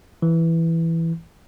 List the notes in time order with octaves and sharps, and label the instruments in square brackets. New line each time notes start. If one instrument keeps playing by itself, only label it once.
[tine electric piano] E3